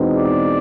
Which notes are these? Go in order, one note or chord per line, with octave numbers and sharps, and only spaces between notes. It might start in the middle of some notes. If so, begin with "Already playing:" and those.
Already playing: E2 B2 G#3 C4 D#4
D5